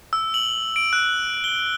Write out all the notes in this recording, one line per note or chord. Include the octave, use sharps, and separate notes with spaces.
E6
F#7
D7
F#6
G7